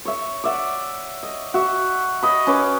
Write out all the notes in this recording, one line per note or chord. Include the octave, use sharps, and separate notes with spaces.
C#5 E5
D5 E5 F#5
D#5
F#4 E5
C#5 D#5 B5
C#4 B4 B5 D6